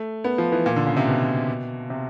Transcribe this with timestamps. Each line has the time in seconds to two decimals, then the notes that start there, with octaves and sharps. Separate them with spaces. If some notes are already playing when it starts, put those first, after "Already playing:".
Already playing: A3
0.24 B3
0.38 F3
0.52 E3
0.66 A#2
0.76 D3
0.86 C#3
0.97 C3
1.07 B2
1.90 C3